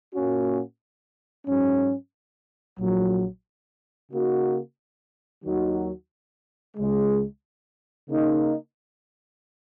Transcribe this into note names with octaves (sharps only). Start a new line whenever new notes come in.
A#2 A#3 C#4 F#4
G#2 F#3 C#4
A#1 A#2 F#3
C#3 A#3 D#4 F#4
D#2 D#3 F#3 D#4 F#4
C#2 C#3 G#3
C#3 A#3 D#4